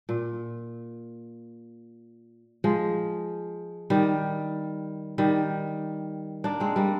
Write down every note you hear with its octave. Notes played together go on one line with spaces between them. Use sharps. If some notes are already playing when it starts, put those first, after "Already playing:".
A#2
F3 G#3
D#3 G3
D#3 G3
A#3 D4
G#3 C4
G3 A#3